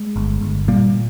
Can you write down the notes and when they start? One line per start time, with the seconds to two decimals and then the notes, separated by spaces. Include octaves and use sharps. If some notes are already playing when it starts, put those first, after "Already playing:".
Already playing: G#3
0.16 G1
0.41 G1
0.68 A#2 G3 A#3